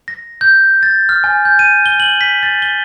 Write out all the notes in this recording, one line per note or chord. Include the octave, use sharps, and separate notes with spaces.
A#6
G6
A6
F6
G#5
G6
D#7
G7
F#7
B6
A6
G7